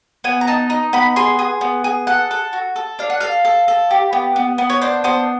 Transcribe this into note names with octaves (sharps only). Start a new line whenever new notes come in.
B3 G#5
A#5
D#4 A5
D#4
B3 B5
G#4 C6
G#4
B3
G#4
A4 F#5
A4
F#4
A4
D4 F5
F#5
A4 F5
A4
A4
G4
B3
B3
B3
C#5
D4 C5
B3 C5